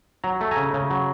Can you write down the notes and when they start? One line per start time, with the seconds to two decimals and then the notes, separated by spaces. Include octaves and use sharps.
0.24 F#3 A#5
0.41 A3
0.51 G#5 A#5
0.57 C#3
0.74 C#3
0.90 F#3